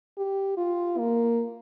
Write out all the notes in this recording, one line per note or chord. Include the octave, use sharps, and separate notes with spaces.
G4
F4
A#3